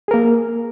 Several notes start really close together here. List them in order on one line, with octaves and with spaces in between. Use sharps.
G#4 A#4 A#3